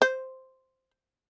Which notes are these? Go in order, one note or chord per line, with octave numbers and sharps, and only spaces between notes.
C5